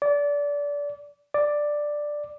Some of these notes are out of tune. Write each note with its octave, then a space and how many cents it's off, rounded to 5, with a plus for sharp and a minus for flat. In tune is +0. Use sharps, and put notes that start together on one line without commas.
D5 -25
D5 +5